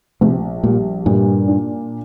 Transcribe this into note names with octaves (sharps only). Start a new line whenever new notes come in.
A#1 C3
A#2 G3
G2 A#2
D4